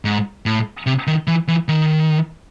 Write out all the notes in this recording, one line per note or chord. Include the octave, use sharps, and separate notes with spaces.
G#2
A2
C3
D#3
E3
E3
D#3